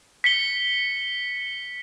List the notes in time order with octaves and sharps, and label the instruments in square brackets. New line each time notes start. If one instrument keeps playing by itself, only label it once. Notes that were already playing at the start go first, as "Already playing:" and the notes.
[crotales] B6 C#7 G7